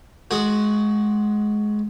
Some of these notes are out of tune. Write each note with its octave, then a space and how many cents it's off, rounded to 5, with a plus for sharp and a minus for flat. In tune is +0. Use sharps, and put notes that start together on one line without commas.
G#3 +20 F#4 +0 D#6 -15